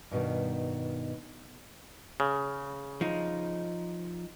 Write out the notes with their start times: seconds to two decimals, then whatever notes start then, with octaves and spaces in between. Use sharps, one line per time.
0.11 G2 B2 D3 D#3
2.20 C#3
3.01 F3 D#4